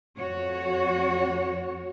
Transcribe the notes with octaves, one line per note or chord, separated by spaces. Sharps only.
F2 F#4 C#5